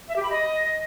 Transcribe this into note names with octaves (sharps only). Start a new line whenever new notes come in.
E5
G4
B5
D#5